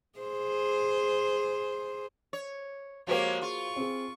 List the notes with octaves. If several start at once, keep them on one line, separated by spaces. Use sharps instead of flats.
G#4 C5
C#5
F3 G#3 A#3 F#4 G4 C5 C#5
F4 C#6
C4 G#4